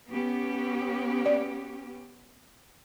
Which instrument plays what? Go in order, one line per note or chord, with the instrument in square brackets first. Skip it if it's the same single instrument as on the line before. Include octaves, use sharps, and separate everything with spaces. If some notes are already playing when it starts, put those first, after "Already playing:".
[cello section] B3 C#4 G4
[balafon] D5